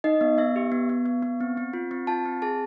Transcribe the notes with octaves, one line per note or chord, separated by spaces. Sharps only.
D#4 D#5
B3
B3 E5
G4
B3
B3
B3
B3
C4
C4
F4
C4
F4 A5
C4
G#4 A5